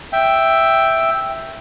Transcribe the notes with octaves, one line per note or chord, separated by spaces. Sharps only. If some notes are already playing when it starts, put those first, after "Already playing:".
E5 G5